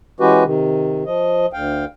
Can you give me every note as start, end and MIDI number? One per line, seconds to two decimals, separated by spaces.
0.20 0.44 52
0.20 0.44 56
0.20 0.44 61
0.20 0.44 66
0.20 0.44 67
0.20 0.44 71
0.44 1.04 48
0.44 1.04 51
1.06 1.46 53
1.06 1.46 75
1.53 1.85 38
1.53 1.85 77
1.53 1.85 79